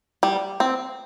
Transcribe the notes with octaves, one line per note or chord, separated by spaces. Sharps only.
G3
C4